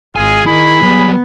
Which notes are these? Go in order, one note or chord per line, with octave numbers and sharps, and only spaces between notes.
G#1 G#3 F4 G#4 G#5
D#3 E4 G#4 B5
F#3 G3 B3